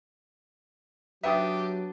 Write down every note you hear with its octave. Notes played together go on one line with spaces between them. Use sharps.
F#3 B3 D4 G4 E5 G5 D#6